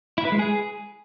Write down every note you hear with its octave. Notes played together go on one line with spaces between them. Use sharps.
E4
B4
G#3
G#4